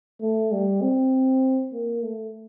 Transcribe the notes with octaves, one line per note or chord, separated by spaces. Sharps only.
A3
G3
C4
A#3
A3